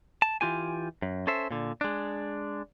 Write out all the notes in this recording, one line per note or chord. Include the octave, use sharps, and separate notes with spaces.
A5
E3 F4 G4 G#5
F#2
C#4 A4 C5 E5
A#2 D3
G#3 D4